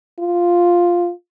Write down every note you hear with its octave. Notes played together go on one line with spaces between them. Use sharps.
F4